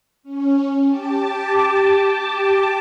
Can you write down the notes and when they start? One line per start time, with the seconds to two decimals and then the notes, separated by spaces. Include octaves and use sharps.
0.23 C#4
0.87 G4 A5 D6